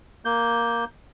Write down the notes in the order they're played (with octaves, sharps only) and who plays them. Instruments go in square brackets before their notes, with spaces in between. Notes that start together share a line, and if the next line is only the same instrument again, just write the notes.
[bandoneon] A#3 G6